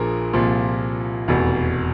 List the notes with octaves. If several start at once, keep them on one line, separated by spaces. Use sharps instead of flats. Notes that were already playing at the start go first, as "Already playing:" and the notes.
Already playing: A#1 A#2 F3 G#4 A#4
C2 A#2 F3
F1 E2 B2